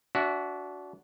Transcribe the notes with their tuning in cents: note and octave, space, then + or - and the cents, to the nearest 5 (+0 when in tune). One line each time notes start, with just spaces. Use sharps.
D4 -25 F#4 -5 E5 +0